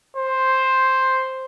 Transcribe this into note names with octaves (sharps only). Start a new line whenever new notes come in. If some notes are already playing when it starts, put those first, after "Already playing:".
C5